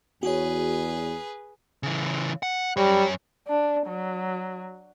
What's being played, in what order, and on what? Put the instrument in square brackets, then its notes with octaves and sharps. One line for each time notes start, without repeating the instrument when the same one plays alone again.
[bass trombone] E2 [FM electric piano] F#4 C#5 [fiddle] G#4 B4
[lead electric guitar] C#3 E3
F#5
[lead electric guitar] F#2 C#5 [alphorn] G3
[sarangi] D4
F#3